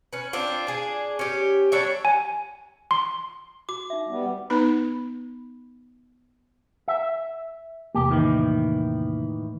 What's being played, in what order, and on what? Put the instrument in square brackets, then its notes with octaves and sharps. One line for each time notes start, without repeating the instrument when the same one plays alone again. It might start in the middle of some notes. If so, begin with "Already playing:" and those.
[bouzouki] C#4 B4
C4 D4 F4
D4 G#4
C#4 G4
G3 D4 C#5 E5
[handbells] G#5
C6
[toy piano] F#4 [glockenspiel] D6
[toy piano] D#4 E5
[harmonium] G3 B3
[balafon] B3 D#4 B4 B5
[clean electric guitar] E5
[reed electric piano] E2 C3 A#3 [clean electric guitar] G4
[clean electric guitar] A2 D#3 E3